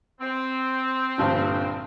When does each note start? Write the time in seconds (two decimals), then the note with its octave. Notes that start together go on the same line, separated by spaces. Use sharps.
0.21 C4
1.18 A#1 G2 D3